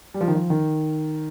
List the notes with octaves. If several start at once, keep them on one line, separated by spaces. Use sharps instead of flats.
G3
F3
D#3
F3
D#3